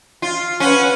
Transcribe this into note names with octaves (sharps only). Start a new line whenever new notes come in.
F4
C#4 B4 F#5